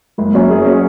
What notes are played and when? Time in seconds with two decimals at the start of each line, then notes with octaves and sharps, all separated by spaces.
0.18 F#1 G#3
0.34 F#2 F#3 A#3 C#4
0.50 F#1 G#4
0.66 F#3 C#4